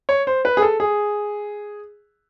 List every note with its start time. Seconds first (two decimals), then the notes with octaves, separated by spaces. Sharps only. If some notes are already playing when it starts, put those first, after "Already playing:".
0.09 C#5
0.27 C5
0.45 B4
0.57 G#4
0.62 A4
0.80 G#4